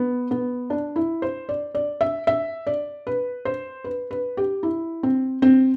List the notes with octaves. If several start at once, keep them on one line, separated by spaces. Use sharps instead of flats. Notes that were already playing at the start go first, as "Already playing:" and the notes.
Already playing: B3
B3
D4
E4
C5
D5
D5
E5
E5
D5
B4
C5
B4
B4
G4
E4
C4
C4